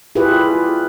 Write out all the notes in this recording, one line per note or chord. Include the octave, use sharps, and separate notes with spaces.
E4 F4 G4 G#4 B4